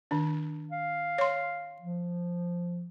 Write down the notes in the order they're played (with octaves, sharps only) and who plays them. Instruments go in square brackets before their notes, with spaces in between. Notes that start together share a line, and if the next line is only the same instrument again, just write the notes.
[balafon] D#3 D4
[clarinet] F5
[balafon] C#5 C6
[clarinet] F3